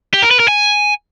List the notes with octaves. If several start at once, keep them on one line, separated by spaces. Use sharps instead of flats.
G4
A#4
B4
A#4
G#5